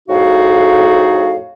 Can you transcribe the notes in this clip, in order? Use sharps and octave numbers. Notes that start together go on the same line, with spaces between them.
F2 A2 D#4 F#4 G#4 F5